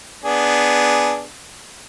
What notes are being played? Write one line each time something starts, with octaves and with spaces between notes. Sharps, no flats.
B3 D4 G#4